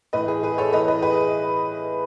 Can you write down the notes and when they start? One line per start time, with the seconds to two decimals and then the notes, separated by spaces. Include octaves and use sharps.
0.13 A2 E3 B4 D#5
0.28 G#4
0.43 G#4 B4
0.58 A4 C#5
0.73 A2 E3 B4 D#5
0.88 B4 D#5
1.02 G#4 B4